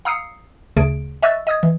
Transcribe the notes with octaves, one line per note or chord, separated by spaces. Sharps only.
F5 A#5 D#6 E6 C7 C#7
D2 C#3 A3 G#4 D7
D#5 E5 C#6 E6 F#6 A6
D#5 D#6 G#6
E3